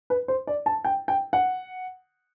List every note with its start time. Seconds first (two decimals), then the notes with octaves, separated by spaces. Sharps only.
0.10 B4
0.28 C5
0.47 D5
0.66 A5
0.85 G5
1.08 G5
1.33 F#5